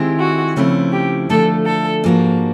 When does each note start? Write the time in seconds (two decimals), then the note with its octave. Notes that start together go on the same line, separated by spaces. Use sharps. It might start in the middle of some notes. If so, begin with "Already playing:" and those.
Already playing: D#3 G#3 C4 E4 G4
0.19 F#4
0.56 C#3 F3 A3 C4 E4
0.93 G4
1.29 D3 F3 A3 D4 A4
1.66 A4
2.04 G#2 F3 A#3 D4 F#4